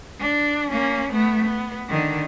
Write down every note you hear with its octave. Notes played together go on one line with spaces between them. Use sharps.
D4
A#3 C#4
A3 B3
B3
D3 D#3